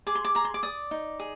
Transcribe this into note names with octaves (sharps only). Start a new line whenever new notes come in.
G#4 D6
C6
D6
G#4 A#5
C6
D6
D5 D#6
D#4
G#4